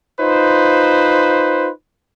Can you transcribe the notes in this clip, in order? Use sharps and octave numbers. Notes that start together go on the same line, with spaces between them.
D#4 F4 B4 C5